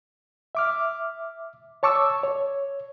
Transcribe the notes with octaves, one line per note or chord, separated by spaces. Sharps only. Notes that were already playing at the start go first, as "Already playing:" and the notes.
E5 D6 F6
C#5 A5 C#6 D6 E6
C#5